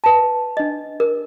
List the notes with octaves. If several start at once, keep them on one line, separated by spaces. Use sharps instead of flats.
B4 A5
D4 D#5
A#4